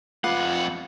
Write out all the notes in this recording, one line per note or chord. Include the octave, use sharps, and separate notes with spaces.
F2 F4 B4 F#5 D6